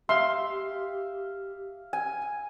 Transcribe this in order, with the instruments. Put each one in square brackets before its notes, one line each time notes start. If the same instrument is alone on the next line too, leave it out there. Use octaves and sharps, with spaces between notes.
[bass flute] G4 [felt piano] E5 [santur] F5 [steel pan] C6
[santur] G#5